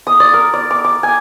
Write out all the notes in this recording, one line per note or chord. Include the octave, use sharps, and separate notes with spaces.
D#6
D5
A#4
D5
D6
D6
G#5